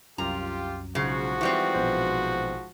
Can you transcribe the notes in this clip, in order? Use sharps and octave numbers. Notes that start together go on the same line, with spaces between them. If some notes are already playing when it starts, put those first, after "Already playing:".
C2 F#2 F4 G4 A#5
B1 G#2 C#3 F3 F#4
E3 G3 C4 C#6
A#1 B2 C5